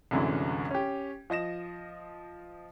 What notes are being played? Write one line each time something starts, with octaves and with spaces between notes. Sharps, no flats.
C2 F#2 D3 E3 F#3 G#3
C#4 G4
F3 D#5 A#6 E7